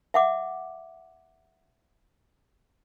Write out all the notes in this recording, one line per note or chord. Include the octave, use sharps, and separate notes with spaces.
E5 F#5 D6